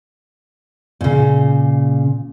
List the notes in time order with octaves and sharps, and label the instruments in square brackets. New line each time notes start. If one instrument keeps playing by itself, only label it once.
[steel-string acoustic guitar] A#2 C#3